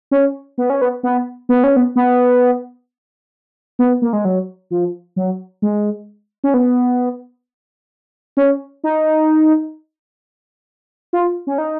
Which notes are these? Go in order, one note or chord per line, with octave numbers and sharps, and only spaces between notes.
C#4
B3
C#4
B3
B3
B3
C#4
B3
B3
B3
A#3
G#3
F#3
F3
F#3
G#3
C#4
B3
C#4
D#4
F4
C#4
D#4